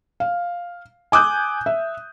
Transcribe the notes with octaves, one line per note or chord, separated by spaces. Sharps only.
F5
G#5 D6 D#6 F#6 G6
E5